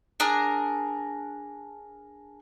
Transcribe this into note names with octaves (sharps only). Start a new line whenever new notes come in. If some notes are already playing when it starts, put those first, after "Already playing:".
D4 G#4 A#4